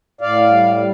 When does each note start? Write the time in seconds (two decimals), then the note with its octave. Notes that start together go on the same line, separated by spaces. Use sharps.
0.21 A2 D5 F5
0.49 G3
0.76 G3